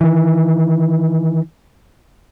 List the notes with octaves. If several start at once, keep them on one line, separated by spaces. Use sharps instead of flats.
D#3 E3